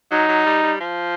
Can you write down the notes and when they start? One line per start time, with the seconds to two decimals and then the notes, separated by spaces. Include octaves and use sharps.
0.11 F#3 D#4
0.28 F#3
0.46 G3
0.63 G3
0.80 F3